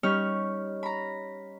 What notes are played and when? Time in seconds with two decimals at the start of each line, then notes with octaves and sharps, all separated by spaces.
0.03 G3 C#4 D#4 C#5 F6
0.83 A#5 B5